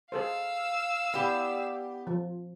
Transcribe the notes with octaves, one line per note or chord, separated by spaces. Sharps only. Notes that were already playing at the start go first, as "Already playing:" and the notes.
G#4 A4 C5 F5 E6
B3 D4 E4 G4
F3